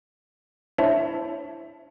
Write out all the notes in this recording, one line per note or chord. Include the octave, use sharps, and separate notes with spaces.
D4 E4 C5 C#5 E5 A5